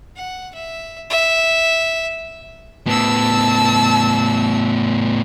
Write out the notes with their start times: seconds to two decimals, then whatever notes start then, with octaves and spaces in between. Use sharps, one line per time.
0.16 F#5
0.54 E5
1.10 E5
2.87 A2 B3 A5 E6